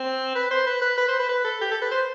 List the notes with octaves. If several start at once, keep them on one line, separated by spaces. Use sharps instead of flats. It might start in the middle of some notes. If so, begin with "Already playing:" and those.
Already playing: C4
B4
C5
B4
B4
B4
C5
B4
B4
A4
G4
A4
B4
C5